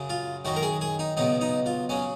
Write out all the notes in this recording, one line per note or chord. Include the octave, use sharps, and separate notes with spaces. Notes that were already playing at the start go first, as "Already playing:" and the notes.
Already playing: F#2 C#3 F#3
F4
F#2 D#3 F#3 F#4
A#4
G#4
G#4
D#4
C#2 B2 F#3 D#4
D#4
F4
C#3 F#3 C#4